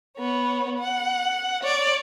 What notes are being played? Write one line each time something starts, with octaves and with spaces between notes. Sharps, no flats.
B3 C#5
F#5
C#5 D5